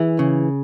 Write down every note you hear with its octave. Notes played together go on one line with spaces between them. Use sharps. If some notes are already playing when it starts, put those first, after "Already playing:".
Already playing: E3 G#4
C#3